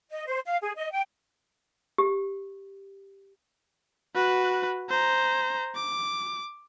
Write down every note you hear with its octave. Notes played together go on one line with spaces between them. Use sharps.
D#5
C5
F5
G#4
D#5
G5
G4
F#4 B4
C5 A#5
D6